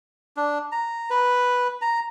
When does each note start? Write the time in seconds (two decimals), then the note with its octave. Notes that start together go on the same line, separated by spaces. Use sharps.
0.37 D4
0.72 A#5
1.10 B4
1.81 A#5